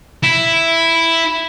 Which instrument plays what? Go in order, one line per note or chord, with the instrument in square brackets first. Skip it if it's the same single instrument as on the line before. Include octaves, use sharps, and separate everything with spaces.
[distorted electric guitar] E4